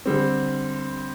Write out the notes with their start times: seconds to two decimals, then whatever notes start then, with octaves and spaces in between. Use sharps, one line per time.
0.06 D3 G3 C4